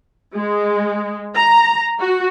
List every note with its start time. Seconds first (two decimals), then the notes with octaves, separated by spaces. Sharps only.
0.35 G#3
1.35 A#5
2.00 F#4